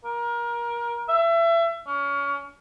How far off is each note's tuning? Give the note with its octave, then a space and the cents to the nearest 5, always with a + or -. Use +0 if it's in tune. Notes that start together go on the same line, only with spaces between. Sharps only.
A#4 +25
E5 +30
C#4 +30